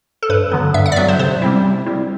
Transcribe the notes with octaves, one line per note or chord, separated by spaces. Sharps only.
A4
G2 B4
D3 F#3 B3
G2 E5
F#5
D5
D3 F#3 B3 E5
C5
C3 C5
G3 C4 E4
C3
G3 C4 E4